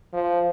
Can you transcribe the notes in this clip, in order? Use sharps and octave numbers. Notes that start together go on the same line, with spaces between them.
F3